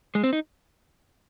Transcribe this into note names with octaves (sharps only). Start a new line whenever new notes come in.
G#3
C4
D#4